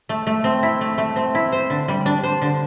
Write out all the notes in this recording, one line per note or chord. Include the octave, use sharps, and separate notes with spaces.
A3
A3
C4
E4
A3
A3
C4
E4
C5
D3
G3
D4
C5
D3